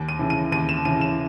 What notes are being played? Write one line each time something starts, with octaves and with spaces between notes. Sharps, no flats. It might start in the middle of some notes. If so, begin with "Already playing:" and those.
Already playing: D#2
D#7
C#3 E3
D#7
D#2 D#7
E7
C#3 E3 D#7
E7